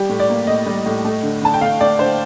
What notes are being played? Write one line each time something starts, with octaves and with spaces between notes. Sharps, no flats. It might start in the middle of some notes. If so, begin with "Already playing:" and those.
Already playing: G3 G4
A2
D5
A#3
A2 D#5
G3
A2
A3
D3
D3 A5
G5
A3 F5
A3 D5
D3 C5